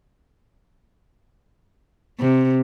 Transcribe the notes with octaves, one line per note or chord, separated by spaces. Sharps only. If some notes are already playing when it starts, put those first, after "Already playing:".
C3